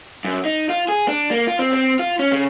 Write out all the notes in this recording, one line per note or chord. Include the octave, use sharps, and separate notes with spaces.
F#2
D#4
F4
G#4
D4
A#3
F4
C4
C4
F4
C#4
C#3